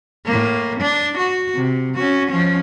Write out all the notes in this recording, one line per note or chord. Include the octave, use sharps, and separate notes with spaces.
A2 A#3
D4
F#4
C3
C#4 F#4
F3 C#4